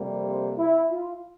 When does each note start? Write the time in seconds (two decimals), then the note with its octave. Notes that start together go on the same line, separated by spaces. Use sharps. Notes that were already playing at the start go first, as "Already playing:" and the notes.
Already playing: F2 C3 G3 A#3
0.26 C5
0.58 E4
0.90 F4